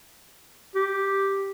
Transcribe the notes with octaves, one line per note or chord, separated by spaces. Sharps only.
G4